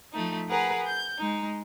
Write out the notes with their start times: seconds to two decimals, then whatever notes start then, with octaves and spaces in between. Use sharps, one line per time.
0.13 F3 A3 D#4
0.49 G#4 A#4 B4 F#5 A#5
0.86 G6
1.18 G#3 D#4